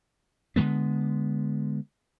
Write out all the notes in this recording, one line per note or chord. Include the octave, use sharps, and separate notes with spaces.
D3 F3 G#3 B3